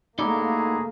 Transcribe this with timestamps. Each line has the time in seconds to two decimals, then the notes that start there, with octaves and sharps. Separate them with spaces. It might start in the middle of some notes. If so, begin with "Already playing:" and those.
0.19 A3 A#3 D#4 E4 F#4 G#4 D5 A#5